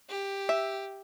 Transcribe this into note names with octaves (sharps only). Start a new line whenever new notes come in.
G4
E5